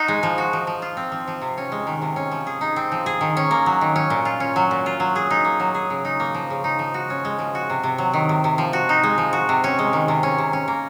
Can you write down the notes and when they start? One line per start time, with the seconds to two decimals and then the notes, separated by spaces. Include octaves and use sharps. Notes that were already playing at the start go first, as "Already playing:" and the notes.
Already playing: D#4 F#4
0.08 G#3
0.23 F3
0.38 F#4
0.53 F3
0.67 F3
0.82 F4
0.97 C4
1.12 F3
1.28 F3
1.42 C3
1.58 C#4
1.72 G#3
1.87 D#3
2.02 C3
2.16 C#4
2.32 F3
2.47 G#4
2.61 D#4
2.76 C4
2.92 F3
3.06 G#4
3.21 D#3
3.37 C#4
3.51 A#3
3.66 F#3
3.81 D#3
3.96 C#4
4.10 A#2
4.25 F4
4.40 C#4
4.56 F#3
4.71 A#2
4.86 F4
5.00 F#3
5.16 G#4
5.31 D#4
5.45 A#3
5.60 F#3
5.75 G#4
5.90 C#3
6.05 D#4
6.20 A#3
6.35 F3
6.50 C#3
6.64 D#4
6.79 F3
6.94 F#4
7.10 C#4
7.25 G#3
7.39 F3
7.55 F#4
7.70 C3
7.83 C3
7.98 F#3
8.14 D#3
8.29 C3
8.44 C3
8.58 F3
8.73 F#4
8.89 D#4
9.03 G#3
9.18 F3
9.33 F#4
9.49 C3
9.64 C#4
9.79 G#3
9.93 D#3
10.08 C3
10.23 C#4
10.38 C3
10.53 C#4
10.68 A#3